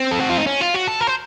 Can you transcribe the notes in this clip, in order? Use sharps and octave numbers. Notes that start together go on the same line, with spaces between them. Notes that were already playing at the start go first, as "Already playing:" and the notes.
Already playing: C4
A4
F#4
F4
D#4
C#4
F4
F#4
A4
A#4
C5